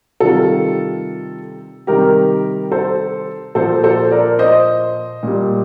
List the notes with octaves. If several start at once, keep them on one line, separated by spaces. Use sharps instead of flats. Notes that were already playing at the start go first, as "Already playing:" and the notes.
C3 D#3 G3 F4 A4
C3 D#3 G3 G4 A#4
A4 C5
A#2 F3 A4 C5
A4 C5
A#4 D5
C5 D#5
A#2 G3